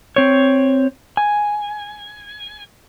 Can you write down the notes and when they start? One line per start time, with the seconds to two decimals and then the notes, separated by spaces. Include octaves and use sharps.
0.16 C4 C#5
1.17 G#5